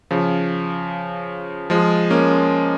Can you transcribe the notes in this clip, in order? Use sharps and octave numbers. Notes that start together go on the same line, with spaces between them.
C#3 F3
F3 G#3
A#3 C#4